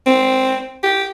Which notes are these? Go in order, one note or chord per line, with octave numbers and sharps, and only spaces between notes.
C4
G4